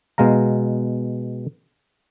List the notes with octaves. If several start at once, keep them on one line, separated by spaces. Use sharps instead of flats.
B2 G#3 F5 A#5